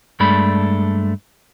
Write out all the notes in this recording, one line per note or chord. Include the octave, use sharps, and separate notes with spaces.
G2 G#3 A3 D4 B5